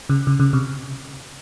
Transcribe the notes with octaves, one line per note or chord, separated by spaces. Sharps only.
C#3
C#3
C#3
C3